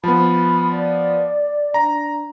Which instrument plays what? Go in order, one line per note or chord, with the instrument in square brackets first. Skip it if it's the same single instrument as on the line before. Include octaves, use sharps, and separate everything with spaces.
[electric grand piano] F3 B3 [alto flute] B5
[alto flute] D5
[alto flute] D4 [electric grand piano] A#5